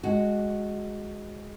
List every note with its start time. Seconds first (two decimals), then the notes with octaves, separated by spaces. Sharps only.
0.03 G#3 F#4